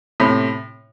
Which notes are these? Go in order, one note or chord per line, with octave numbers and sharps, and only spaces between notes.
A2 C3